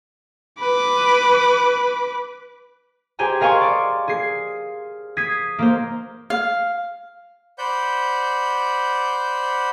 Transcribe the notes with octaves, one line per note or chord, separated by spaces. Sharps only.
B4 D6
G4 G#4 C5 G#5 A#5
G#4 A#4 F5 G#5 C6 C#6
D5
G#4 C7
D#6 G#6 B6 C7 D#7
A#3 A#4 C5
F5
C5 D5 F#5 B5 G6